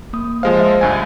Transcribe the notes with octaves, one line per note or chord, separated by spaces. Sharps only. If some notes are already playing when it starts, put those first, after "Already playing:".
A#3 D#6
F3 G#3 C5 F5
E5
C#2 G2 G#5